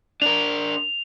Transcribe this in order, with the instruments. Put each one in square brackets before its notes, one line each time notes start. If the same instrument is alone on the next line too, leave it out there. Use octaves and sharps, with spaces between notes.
[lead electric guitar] D4 A#4 [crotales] F7